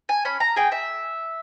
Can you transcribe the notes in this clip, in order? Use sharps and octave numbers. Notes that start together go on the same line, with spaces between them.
G#5
C#4 B5
A#5
G#4 G5
E5